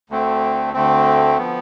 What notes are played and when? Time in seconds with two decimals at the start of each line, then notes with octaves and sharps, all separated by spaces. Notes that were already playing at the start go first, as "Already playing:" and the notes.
0.10 D2 D3 A3 C4
0.74 D2 D3 A3 C4
1.38 F3 B3